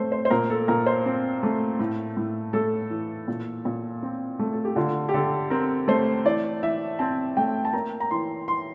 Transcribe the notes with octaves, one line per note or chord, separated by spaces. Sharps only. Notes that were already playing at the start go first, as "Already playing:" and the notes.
Already playing: A3 C4 C5
C5
C5
A#2 A#4
A4
A#2 A#4
C5
C4
A3
A2
A2
A3 A4
E3
A#2
A#2
C4
A3
A4
G4
D3 F4
G4
D3 A4
C4 A#4
A3 C5
E3 D5
E3 E5
C4 A5
A3 G5
A5
A#3 A#5
A#5
E3 C6
E3 C6